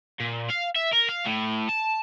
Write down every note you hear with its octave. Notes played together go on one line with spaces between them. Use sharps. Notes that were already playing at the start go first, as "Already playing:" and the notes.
A#2
F5
E5
A#4
F5
A2
A5